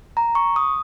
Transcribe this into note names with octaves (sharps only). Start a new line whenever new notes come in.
A#5
C#6
D#6